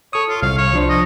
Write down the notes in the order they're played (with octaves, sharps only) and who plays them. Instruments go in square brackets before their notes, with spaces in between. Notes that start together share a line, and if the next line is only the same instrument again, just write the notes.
[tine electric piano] A4 D#6 [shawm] C#5
[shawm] F4
[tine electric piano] C2 [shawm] F5
[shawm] C#5
[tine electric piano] F3 D4 C5
[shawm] D#5